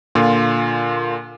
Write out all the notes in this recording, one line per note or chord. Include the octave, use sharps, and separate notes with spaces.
A#2 D3 F4